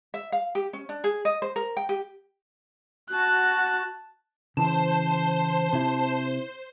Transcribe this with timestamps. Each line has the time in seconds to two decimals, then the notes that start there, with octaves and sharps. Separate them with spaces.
0.14 E5
0.32 F5
0.55 G4
0.73 C#4
0.89 D4
1.04 G#4
1.25 D#5
1.42 C5
1.56 A#4
1.77 G5
1.89 G4
3.10 F#4 A5 F#6
4.57 C#3 E3 C5 A5
5.73 C3 E4